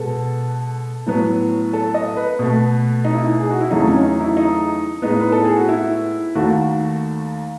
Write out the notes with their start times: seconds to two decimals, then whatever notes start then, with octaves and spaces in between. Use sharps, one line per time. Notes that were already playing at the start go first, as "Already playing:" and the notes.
Already playing: B2 G#3 B3 A4
1.06 A2 F#3 B3
1.73 A4
1.94 D#5
2.17 B4
2.39 B2 A3
3.05 D#4
3.14 E4
3.24 D#4
3.40 G#4
3.50 F#4
3.61 E4
3.71 E2 C#3 F#3 A3 D#4
3.87 C#4
4.03 D#4
4.20 E4
4.37 D#4
5.02 A2 G#3 B3 D#4
5.21 B4
5.32 A4
5.44 G#4
5.56 F#4
5.69 E4
6.35 D#2 D#3 A3 F#4